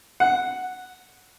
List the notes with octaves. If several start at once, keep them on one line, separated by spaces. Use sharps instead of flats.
F#5